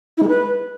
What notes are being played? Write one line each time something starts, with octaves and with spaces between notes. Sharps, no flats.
E4
G#3
B4